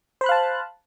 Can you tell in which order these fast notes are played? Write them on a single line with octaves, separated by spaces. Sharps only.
C5 B5 F#6 F5 A5